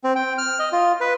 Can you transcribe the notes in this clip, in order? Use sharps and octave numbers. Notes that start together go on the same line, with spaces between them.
C4
G5
F6
D#5
F4
B4